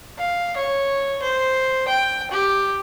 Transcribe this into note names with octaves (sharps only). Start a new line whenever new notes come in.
F5
C#5
C5
G5
G4